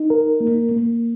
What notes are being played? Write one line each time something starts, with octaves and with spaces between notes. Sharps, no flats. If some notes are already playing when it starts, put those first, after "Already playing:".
Already playing: D#4
A#4
A#3
A#3